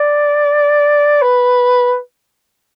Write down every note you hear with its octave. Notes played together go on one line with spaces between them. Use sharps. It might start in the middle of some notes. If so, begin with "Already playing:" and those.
Already playing: D5
B4